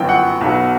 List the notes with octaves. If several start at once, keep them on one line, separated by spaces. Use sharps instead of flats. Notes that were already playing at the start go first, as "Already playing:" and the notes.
Already playing: G1 F#2 E3 G5
F#5
B1 B2 F#3